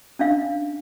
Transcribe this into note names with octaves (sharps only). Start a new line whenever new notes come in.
C#4 D4 F5